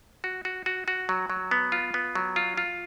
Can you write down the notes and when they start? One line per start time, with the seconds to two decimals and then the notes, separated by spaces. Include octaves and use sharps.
0.24 F#4
0.45 F#4
0.66 F#4
0.88 F#4
1.09 F#3
1.30 F#3
1.51 B3
1.72 F4
1.94 B3
2.15 F#3
2.36 F4
2.57 F4